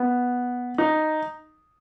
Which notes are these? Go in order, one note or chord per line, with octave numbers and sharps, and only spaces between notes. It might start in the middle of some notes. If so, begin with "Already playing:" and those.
Already playing: B3
D#4